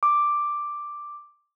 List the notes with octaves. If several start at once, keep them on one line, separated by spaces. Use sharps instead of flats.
D6